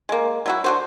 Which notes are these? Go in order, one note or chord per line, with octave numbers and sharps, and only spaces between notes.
G#3 A#3
F#3 E4 F#4
D3 F#4 C5